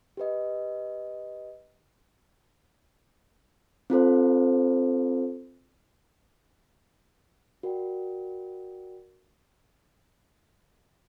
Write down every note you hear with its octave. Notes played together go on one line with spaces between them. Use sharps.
G4 B4 D#5
C4 F4 A4 C5
F#4 A#4 D5 G5